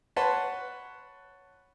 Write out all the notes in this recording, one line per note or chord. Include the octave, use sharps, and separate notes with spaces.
B4 C#5 F#5 A5 C6